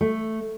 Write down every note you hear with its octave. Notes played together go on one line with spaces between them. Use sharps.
A3